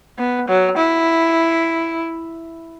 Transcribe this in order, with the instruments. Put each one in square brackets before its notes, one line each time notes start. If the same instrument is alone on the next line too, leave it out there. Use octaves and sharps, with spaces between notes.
[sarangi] B3
F#3
E4